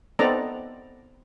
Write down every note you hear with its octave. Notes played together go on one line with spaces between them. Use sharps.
B3 C4 D#4 A4 D5 A#5